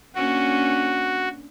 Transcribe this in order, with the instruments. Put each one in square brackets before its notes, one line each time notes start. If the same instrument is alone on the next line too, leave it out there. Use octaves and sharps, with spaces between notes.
[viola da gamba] A#3 C#4 D4 [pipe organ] F#4